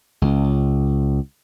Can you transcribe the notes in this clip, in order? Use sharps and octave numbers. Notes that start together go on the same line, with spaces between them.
C#2